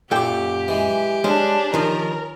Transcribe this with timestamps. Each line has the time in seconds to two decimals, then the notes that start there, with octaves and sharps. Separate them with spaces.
0.11 F#2 A#2 G4 A4 G5 D6
0.68 E3 G#3
1.24 G#3 C#4 D4
1.74 D#3 F3 A#4